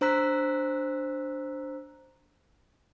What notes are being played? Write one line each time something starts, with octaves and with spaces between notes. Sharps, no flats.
D4 C5 A#5 E6 F#6 B6